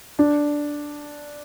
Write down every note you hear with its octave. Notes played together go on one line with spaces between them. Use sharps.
D4